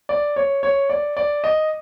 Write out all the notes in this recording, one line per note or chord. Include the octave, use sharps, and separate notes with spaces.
D5
C#5
C#5
D5
D5
D#5